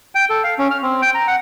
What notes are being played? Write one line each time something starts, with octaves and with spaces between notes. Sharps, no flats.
G5
A4
F5
C#4
F6
C4
G5
A#5
F#5